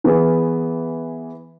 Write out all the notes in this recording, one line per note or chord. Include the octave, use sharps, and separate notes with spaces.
E3 B3 G#4 B4